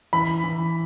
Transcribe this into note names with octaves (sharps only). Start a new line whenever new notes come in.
E3 B5
E3